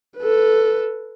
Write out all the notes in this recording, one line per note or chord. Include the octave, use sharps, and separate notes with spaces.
A4 B4